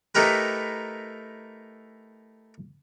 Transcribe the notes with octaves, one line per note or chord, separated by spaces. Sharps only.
A3 D#4 E4 G4 A#4 B4